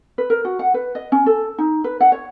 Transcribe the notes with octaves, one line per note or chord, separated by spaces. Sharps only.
B4
A#4
F#4
F#5
B4
D#5
C#4
A4
D#4
B4
F#5
C#5